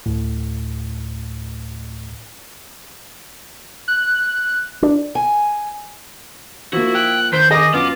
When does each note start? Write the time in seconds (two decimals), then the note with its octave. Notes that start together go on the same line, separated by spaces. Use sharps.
0.06 D2 A2
3.88 F#6
4.82 D4
5.15 G#5
6.73 F3 A#3 E4 F#4
6.95 G5 F#6
7.33 D#3 C5 G6 B6
7.51 D#3 G#4 D#5 D6 A#6
7.74 F#2 B3 F4 D6